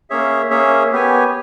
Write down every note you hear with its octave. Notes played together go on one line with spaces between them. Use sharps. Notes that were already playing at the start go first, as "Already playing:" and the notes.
A#3 C#4 G#4 C#5 E5
A#3 C#4 G#4 C#5 E5
B3 G4 C#5 G#5